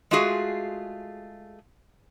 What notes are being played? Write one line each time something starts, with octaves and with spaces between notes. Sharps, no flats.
G#3 A3 F4 F#4 G#4